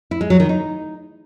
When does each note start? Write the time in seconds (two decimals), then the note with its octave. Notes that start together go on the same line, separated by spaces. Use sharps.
0.11 E4
0.21 G#3
0.30 F#3
0.40 D#3
0.49 D#4